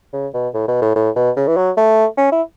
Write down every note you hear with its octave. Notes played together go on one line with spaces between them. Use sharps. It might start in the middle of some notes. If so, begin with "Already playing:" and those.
C#3
B2
A2
B2
A2
A2
B2
C#3
E3
F#3
A3
C#4
E4